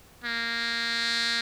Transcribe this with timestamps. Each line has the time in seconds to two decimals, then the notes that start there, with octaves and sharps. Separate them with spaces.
0.24 A#3